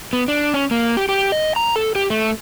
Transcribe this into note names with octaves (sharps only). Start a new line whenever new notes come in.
B3
D4
C#4
A#3
G4
G4
D#5
A#5
A4
G4
A3